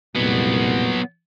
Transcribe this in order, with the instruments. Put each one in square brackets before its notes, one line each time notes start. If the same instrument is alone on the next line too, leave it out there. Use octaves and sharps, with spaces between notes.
[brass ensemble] C2 F2 A#2 [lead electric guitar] F#3 B3